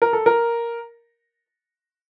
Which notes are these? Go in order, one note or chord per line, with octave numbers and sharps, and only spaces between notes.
A#4
A4
A#4